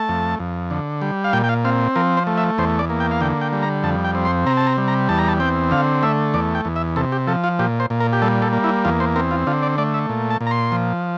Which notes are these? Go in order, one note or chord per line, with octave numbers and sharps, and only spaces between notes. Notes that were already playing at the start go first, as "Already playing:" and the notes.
Already playing: A3 A5
F2
F2
D3
G3
F5
A#2 G5
G5
F5
C4 F5
F3 A#4
C5
A3
E5
E2 C5
D5
A#3
G5
F5
D3 G5
G5
G3
A#5
F2 A5
G5
C4
C6
C3 A#5
A5
A#5
G3
A#5
E2 A5
A#5
A5
C4 G5
D3 F5
A3 E5
E2 D5
G5
E2
E5
C3 A4
G4
F3 A4
F4
A#2 G4
C5
A#2
A#4
G4
G3 A4
A4
A#3
E4
E2 F4
C5
C4 A#4
F4
D3 F4
D5
A3 D5
E5
A#2
A5
A#2
A#5
C6
F3